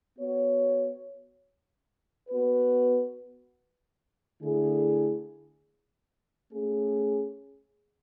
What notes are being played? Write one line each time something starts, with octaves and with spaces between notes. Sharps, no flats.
B3 F#4 C#5
B3 F#4 B4
D3 A3 E4 G#4
A3 C#4 G#4